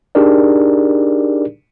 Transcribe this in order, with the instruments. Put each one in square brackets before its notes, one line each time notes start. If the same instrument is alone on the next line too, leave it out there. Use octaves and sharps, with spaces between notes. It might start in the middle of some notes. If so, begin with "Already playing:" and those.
[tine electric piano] D4 D#4 G4 G#4 A#4 D5